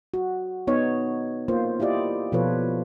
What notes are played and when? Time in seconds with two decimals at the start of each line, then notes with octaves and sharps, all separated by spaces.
0.14 F#4
0.67 B3 D#4 C#5
1.48 A#3 F4 C5
1.80 E4 F4 G4 D5 D#5
2.32 B2 F3 F4 A4 B4 C#5